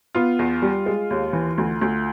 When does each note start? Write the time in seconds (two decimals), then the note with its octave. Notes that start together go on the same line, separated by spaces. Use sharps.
0.15 B3 F4
0.39 E2
0.62 G3
0.86 G#3
1.10 D#2
1.33 E3
1.58 D2
1.81 D2